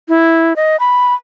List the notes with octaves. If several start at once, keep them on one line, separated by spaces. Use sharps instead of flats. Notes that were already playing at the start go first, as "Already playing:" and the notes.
E4
D#5
B5